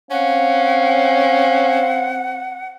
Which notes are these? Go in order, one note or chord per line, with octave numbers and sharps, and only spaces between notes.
C4 C#4 F5 F#5